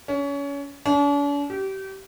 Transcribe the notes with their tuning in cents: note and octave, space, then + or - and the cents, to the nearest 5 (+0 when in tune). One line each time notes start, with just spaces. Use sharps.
C#4 +30
D4 -45
G4 -30